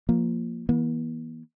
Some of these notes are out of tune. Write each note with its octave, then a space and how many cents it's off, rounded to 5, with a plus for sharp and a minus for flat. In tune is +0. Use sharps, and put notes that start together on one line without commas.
F3 +0 A#3 +0
E3 -20 A#3 +45